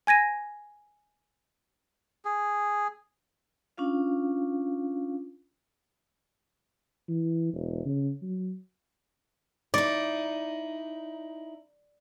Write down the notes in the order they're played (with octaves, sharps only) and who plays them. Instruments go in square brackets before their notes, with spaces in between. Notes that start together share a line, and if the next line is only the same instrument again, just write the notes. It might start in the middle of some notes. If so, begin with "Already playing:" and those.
[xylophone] G#5 G#6 A#6 D#7
[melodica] G#4
[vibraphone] C#4 D4 F4 F5
[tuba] E3
E1
C#3
F#3
[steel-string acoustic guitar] D#4 E4 [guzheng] D5